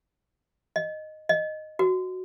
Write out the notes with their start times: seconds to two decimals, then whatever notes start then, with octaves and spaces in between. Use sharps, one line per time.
0.76 D#5
1.29 D#5
1.79 F#4